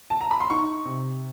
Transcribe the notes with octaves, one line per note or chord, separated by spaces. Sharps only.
A5
A#5
B5
C6
D#4 C#6
C3